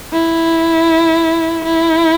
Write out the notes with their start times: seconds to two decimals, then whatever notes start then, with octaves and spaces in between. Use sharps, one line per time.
0.13 E4
1.65 E4